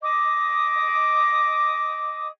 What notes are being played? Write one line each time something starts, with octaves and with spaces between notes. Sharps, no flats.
D#5 D6 D#6